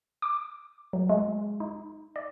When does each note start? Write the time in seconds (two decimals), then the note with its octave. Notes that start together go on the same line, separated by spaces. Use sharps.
0.22 D6
0.93 F#3
1.09 G#3
1.60 D#4
2.16 D5